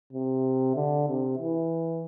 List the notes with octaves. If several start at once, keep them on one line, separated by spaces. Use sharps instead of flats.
C3
D3
C3
E3